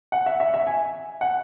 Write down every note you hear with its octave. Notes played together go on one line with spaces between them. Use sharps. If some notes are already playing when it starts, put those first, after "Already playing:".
F#5
E5
E5
E5
G#5
F#5